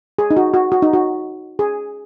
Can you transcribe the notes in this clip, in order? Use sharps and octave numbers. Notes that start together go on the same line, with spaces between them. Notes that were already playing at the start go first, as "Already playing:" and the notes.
G#4
D#4
F#4
F#4
F#4
D#4
F#4
G#4